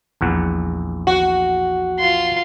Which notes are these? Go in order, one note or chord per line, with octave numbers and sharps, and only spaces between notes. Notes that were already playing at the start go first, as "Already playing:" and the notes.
A#1 E2 F#5
F#4
F4 C6